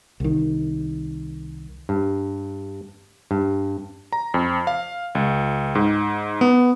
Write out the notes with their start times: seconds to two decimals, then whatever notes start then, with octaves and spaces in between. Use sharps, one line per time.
0.20 C2 D#3
1.89 G2
3.31 G2
4.12 A#5
4.34 F2
4.67 F5
5.15 C#2
5.75 G#2
6.41 B3